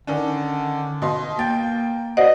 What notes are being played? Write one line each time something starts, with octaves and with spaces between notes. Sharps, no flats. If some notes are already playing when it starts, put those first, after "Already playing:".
D3 D#3 C#4 D4
B2 D#5 C6
A#3 G5 A6
F#4 C5 D5 D#5 F#5